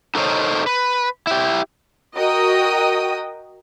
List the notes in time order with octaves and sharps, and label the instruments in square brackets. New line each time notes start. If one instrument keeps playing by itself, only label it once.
[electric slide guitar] D#4 A4 A#4 C5 C#5 D#5
B4
E4 G4
[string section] F#4 A#4 D#5 G5 D#6